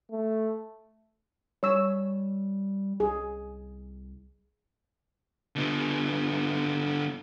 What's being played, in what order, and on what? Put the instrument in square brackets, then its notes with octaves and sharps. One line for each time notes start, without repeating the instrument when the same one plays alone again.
[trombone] A3
[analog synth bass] G3 [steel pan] C#5 E6
[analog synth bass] C2 [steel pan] G#4
[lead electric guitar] D3 B3